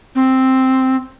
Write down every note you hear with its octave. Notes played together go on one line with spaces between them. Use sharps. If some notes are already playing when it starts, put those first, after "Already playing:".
C4